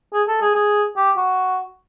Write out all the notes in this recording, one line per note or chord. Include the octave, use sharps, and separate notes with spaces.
G#4
A4
G#4
G#4
G4
F#4